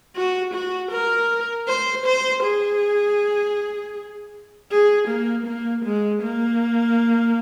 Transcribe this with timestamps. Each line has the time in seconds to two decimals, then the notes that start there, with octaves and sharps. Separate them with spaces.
0.16 F#4
0.54 F#4
0.92 A#4
1.68 C5
2.06 C5
2.44 G#4
4.71 G#4
5.08 A#3
5.47 A#3
5.85 G#3
6.23 A#3